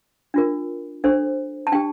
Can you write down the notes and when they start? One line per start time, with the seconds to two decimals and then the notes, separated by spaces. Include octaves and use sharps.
0.34 D4 F4 A#4
1.04 D4 A4 C5
1.67 A5
1.72 D4 G4 G5